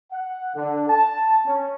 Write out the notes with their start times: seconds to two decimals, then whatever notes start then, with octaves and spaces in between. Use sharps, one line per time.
0.12 F#5
0.56 D3
0.90 A5
1.46 C#4